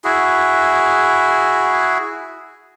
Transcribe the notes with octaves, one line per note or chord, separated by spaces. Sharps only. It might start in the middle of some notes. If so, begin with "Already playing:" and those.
E4 F#4 G#4